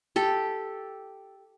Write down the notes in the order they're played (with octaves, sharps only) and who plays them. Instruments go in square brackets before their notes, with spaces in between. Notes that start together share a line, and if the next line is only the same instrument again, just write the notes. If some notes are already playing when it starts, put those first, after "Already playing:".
[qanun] G4 A4